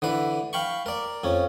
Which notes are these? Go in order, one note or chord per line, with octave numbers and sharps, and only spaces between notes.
D3 E3 B4
F5 G5 B5 C#6
A#4 D5
F2 C#4